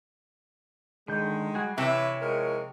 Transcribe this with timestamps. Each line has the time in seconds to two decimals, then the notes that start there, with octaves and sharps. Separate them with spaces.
1.08 D3 D#3 G#3 G6
1.55 G3 F#4 G#4
1.78 C3 E3 E4 B4 C#5 E5
2.22 F3 G#3 A#4